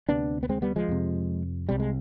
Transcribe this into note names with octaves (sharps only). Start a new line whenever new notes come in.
D2 C3 B3 D4
B3
G#3 C4
G3 B3
F3 G#3
F2 C3
C2 C3 G3
G#3